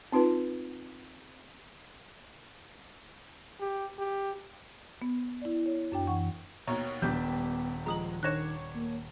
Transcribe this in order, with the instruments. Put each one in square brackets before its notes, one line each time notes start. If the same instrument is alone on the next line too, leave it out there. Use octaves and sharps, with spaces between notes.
[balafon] C4 D#4 F4 B4
[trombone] G4
G4
[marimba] B3
E4 D5
C#5
F#2 D4 G5
F#2 E3 F#5 C#6
[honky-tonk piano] D#2 B2 [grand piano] C#5 [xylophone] A#5
[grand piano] D#1 [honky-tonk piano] G3 D4 G4 [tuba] B3 [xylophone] G6
[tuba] F3 [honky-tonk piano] G#3 [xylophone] A#5 D#6 F#7
[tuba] D#3 [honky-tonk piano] D4 C#5 [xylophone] F#6 A#6 E7
[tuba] A#3